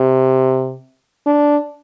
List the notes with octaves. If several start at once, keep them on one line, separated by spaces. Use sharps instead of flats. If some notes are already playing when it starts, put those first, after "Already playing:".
Already playing: C3
D4